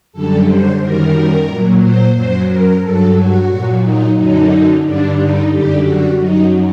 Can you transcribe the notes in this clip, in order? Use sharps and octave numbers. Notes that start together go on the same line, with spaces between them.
F#2 D3 G3 A4
C5
F#2 D#3 G3 A#4
A#2 F#3
C5
F#2 F#3 C5
A#4
G2 F#3 A4
F#4
A#2 F#3
D#4
F#2 D3 F#3 D#4
G2 D3 G3 D4
D#4
F#2 D3 G3 G4
F#4
F#2 F#3 D#4